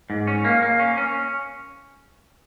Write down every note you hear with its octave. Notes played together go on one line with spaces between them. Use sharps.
G#2
C#4
A#3
A#3
C#4
C#4